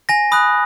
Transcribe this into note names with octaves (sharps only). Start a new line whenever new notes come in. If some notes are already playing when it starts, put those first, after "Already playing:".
G#5 A#6
B5 D#6 F#6